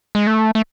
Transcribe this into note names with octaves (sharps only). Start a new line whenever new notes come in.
G#3
A3
A3